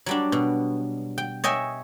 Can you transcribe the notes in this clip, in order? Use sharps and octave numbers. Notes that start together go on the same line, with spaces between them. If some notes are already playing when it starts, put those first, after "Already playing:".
F#3 G3 D4
B2
G5
C#5 D#5 E5 G5 G#5